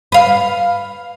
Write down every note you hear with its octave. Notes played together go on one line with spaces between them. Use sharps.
B4 F5